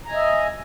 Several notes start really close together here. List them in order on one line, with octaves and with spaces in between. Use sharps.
A#5 G#5 D#5 E5